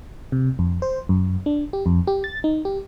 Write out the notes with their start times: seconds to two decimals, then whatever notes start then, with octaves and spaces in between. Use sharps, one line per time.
0.32 C3
0.59 F2
0.82 C5
1.09 F#2
1.46 D4
1.73 G4
1.86 F2
2.07 G4
2.24 A6
2.44 D#4
2.65 G4